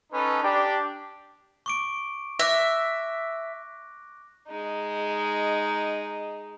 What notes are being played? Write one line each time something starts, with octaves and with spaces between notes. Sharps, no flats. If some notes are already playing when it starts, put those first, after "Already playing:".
C#4 D#4 A4 B4
D4 G4
C#6 D6 D7
E5 D6 F#6 A#6
G#3 D#4